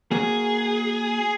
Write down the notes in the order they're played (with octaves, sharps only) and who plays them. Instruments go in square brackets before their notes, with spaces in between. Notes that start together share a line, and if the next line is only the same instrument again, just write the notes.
[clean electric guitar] A#3 F#4 C#5 [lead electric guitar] G#4